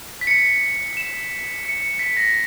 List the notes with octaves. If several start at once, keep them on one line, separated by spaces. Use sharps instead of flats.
B6
C#7
E7
C#7
C#7
B6
A#6